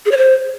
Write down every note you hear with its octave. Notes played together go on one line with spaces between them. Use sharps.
G#4
C#5
C5